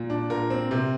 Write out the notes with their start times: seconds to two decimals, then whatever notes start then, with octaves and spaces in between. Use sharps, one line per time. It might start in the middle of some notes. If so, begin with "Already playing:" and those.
Already playing: A#2
0.10 D4
0.30 A#2 A#4
0.50 C4
0.71 C3